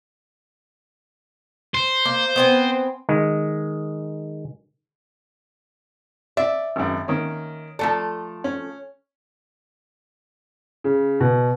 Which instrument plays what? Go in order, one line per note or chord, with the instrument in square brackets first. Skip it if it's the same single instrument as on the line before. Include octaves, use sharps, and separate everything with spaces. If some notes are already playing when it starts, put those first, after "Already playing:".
[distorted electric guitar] C5
[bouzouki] A#3
B3 C4 G#5
[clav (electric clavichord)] D#3 G#3
[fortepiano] D5 [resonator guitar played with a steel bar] E5
[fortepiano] G#1 F#2
D#3 A#3 C#4
[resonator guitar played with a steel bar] F3 A3 A4 [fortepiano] D5 A#5
[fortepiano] C#4
[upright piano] C#3
B2